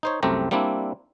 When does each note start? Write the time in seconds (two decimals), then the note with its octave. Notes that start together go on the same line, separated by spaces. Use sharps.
0.03 D#4 C5 C#5
0.23 C2 F#2 A3 C4 G4 A#5
0.51 G3 A#3 C4 D4 E4